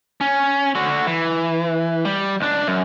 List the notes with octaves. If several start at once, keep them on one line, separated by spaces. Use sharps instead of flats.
C#4
D3 F#4
E3
G3
C#2 D4
F#2